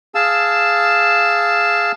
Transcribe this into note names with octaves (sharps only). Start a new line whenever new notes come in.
G#4 F5 A5 E6